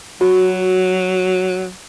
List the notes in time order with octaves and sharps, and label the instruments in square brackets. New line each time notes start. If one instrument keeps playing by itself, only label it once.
[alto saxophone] F#3 [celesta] F#4